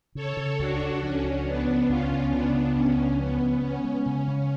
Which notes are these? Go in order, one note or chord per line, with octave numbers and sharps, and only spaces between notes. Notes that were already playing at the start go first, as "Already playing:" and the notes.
C#3 A4 C#5
C#3
C#2 D4 F#4
C#2
F3 C#4
C#2
F3 B3 D4
C#3
C#2 C#4 F4
C#3
C#2 B3 D4
C#3
C#2 C#4
C#2
F3 B3
C#3
B3 C#4
G#3
C#3
C#3